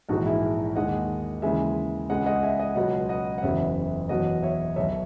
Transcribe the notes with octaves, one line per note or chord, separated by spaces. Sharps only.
A#1 G#2 E3 G#3 D#4 F#4
E4 G#4
D#2 D#3 G#3 D#5 F#5
D#2 C#3 E3 G#3 E5 G#5
C#2 C#3 G#3 D#5 F#5
D#5 F#5
E5 G#5
D#5 F#5
C#2 B2 F#3 D#5 F#5
D#5 F#5
F#5
F#1 E2 C#3 F#3 C#5 E5
E2 B2 F#3 D#5 F#5
C#5 E5
B1 B2 F#3 C#5 E5